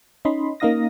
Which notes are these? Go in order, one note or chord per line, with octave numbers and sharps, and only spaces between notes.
C#4 D#4 D#5 B5 C6
A#3 C#4 D#4 F5 D#6 A#6